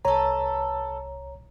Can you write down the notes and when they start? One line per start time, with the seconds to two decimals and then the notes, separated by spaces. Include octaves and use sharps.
0.05 C2 A4 B4 C#5 A#5